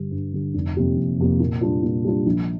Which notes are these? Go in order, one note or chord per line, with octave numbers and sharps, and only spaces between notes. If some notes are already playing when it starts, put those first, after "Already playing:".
Already playing: G2 D3 G3
G2
D3 G3
F1
F2 C3 A#3 G4
F1
F2 C3 A#3 G4
A#2
G3 D4 F4
A#2
G3 D4 F4
A#1